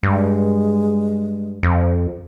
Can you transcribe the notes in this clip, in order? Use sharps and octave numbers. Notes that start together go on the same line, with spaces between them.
G2 G#3
F2